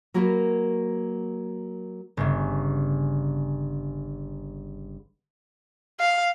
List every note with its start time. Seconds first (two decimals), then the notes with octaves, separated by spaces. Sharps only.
0.14 F#3 A#3 F#4 A#4 B4
2.17 G1 C#3
6.00 F5